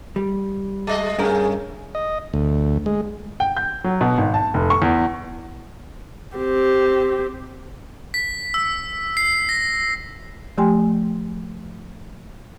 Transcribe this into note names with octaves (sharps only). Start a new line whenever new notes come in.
G3
G#3 D#5
G2 A3 C#4 G#4 A#4
D#5
D2
G#3
G5
G6
F#3
B2
G#1
A5
F1
C#6
E2
C4 G4
B6
E6
C7
A#6
F3 A3 G4 G5 G#5 C6